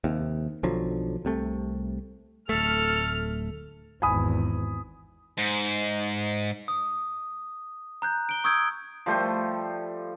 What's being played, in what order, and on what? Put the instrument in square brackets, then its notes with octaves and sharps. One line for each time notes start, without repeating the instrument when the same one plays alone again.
[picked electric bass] D#2 C3
B1 D3 F3 F#3
C2 C3 A3
[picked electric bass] D1 A3 [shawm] A4 [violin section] F6
[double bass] G#1 E2 [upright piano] G#5 B5 D#6
[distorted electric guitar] G#2
[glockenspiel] D#6
A#5 F#6 G6
D7 G7
C#6 D#6 E6 G6 G#6 D7
[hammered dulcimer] F3 G3 A3 C5